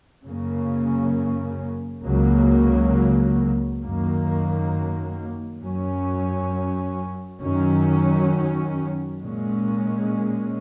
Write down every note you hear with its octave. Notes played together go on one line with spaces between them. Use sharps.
F#2 C#3 A#3 C#4
C#2 C#3 F#3 A#3
F#2 D#3 A#3
F#2 F#3 C#4
F#2 D#3 F#3 C#4
A#2 G#3 C#4